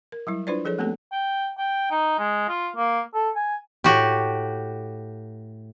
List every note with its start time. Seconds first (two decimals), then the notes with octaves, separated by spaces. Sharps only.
0.12 A#4
0.27 F#3 G3 E4
0.47 D4 E4 F4 B4 C5 D5
0.65 F3 G#4 A4 C#5
0.78 G#3 A3 B3 C4 G4 A4
1.12 G5
1.58 G5
1.91 D#4
2.19 G#3
2.49 F4
2.76 A#3
3.14 A4
3.36 G#5
3.84 A2 F#4 G4